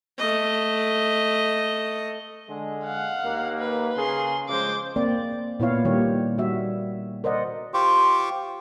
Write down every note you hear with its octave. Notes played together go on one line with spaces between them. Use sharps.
A3 D#5
D3 G#3
F5 F#5
D#2 A#3
B4
C#3 G#4 A#4 C6
C#3 F3 G#3 C5 D6
A#3 C4 D5
A#2 B3 E4 F4 C#5 F5
D#3 G3 A#3 G4 C#5
G3 F#4 E5
A#4 C5 D5 D#5 F#5
F4 G4 C5 C#6 D6